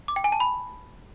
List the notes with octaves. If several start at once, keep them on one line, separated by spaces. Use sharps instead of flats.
D6
G5
G#5
A5
B5